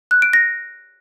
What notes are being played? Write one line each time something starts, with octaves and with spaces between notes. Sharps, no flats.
F#6
D7
A#6